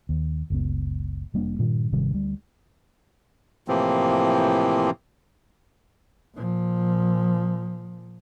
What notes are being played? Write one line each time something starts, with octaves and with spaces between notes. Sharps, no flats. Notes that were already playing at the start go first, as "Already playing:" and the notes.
D#2
F#1 C#2 B3
F1 G3 A#3 D4
G2 A#2 D#3 G3
G#1 C3 D#3 G3
D2 G3
A2 C3 E3 F3 A#3 C4
A#2 F3